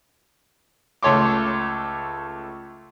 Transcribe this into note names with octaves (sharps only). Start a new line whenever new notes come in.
C#2 A3 C#5 C6 D6